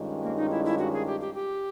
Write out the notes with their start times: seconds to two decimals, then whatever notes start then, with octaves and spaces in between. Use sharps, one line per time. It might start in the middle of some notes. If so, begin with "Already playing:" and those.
Already playing: G2 D#3 G#3 C#4 F4
0.23 A#3
0.37 D#4
0.51 E4
0.65 E4
0.78 F#4
0.93 G#4
1.06 G4
1.21 G4
1.34 G4